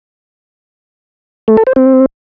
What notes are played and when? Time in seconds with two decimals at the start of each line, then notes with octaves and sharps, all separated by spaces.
1.48 A3
1.57 A4
1.67 C5
1.76 C4